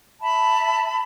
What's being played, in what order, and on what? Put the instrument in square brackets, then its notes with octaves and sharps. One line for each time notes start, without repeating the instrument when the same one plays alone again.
[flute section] E5 A5 B5